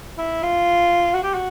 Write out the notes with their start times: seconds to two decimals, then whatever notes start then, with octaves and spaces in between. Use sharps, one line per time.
0.18 E4
0.43 F4
1.14 F#4
1.23 G4
1.34 F#4